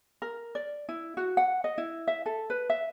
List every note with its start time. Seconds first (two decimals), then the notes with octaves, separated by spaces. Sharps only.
0.22 A#4
0.55 D5
0.89 E4
1.17 F#4
1.37 F#5
1.64 D#5
1.78 E4
2.08 E5
2.26 A4
2.50 B4
2.70 E5